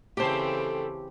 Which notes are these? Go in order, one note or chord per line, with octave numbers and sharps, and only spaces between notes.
C#3 E3 A3 C4 G4 C5 A5